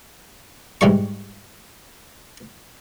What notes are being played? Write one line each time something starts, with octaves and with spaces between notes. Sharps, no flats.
G#2 E3 G3 C#6